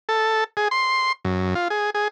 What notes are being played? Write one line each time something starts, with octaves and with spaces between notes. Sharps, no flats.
A4
G#4
C6
F#2
F4
G#4
G#4